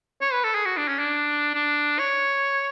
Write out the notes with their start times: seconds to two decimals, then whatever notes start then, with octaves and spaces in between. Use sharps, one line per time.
0.21 C#5
0.33 B4
0.44 A4
0.55 G#4
0.65 F#4
0.77 D4
0.88 C#4
0.99 D4
1.54 D4
1.99 C#5